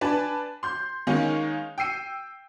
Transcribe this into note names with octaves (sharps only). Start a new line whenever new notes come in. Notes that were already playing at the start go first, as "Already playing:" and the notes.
D4 B4 G#5 A5
C6 G6
D#3 G#3 A#3 C#4 D#4
G5 E6 C7 D#7